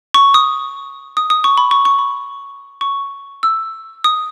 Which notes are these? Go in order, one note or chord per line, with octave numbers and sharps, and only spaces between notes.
C#6
D#6
D#6
D#6
C#6
B5
C#6
C#6
B5
C#6
E6
D#6